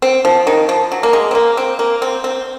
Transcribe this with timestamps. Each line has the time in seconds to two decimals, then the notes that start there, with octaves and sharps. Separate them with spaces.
0.02 C4
0.25 F3
0.47 D#3
0.69 F3
0.92 F#3
1.03 A#3
1.13 G#3
1.31 C4
1.35 A#3
1.57 C4
1.79 A#3
2.02 C4
2.24 C4